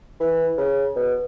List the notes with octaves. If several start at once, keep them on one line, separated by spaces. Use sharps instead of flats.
E3
C#3
B2